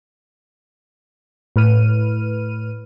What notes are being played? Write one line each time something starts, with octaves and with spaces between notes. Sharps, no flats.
A2 B4 F6 D#7